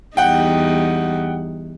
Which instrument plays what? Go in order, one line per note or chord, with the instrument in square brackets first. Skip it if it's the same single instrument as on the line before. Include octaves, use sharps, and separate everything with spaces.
[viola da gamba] E2 G3 D#4 [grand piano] F#5 G5